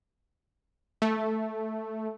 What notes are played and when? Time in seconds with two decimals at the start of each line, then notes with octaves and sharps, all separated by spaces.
1.02 A3